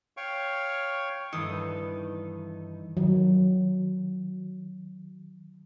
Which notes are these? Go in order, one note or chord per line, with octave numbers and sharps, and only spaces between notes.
C#5 F5 G5 C#6
G2 D#3 E3 D#4 A4 D#6
D#3 F#3